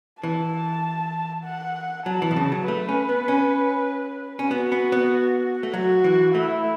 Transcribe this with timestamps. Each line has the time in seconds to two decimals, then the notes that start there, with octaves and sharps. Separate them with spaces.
0.23 E3 A5
1.45 F#5
2.06 F#3 A5
2.22 E3
2.31 B2
2.36 C#3
2.52 F#3
2.68 A3 B4
2.89 C#4
3.09 B3
3.28 C#4
4.39 C#4
4.51 B3 F#4
4.72 B3
4.92 B3
5.63 A3
5.73 F#3 F#4
6.04 E3
6.35 A3 E4